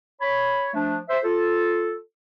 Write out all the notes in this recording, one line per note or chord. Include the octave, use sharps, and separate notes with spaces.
C#5 B5
F3 A3 D4
C5 E5
F4 A4